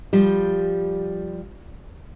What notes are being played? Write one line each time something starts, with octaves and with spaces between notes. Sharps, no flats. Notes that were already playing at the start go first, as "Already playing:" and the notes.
F3 G3